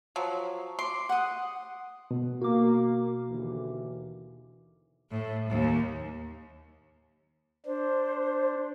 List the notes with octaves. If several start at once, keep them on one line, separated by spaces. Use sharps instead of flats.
F3 F#3
C6 D6
F#5 D#6
B2
A#3 F#4 D6
D#2 D3 E3
A2
D#2
D4 C5